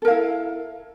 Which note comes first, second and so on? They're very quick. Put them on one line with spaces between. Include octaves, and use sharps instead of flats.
A4 A#4 F5 E4